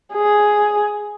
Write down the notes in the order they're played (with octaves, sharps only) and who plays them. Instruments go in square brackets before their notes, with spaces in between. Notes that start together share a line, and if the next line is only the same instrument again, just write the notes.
[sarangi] G#4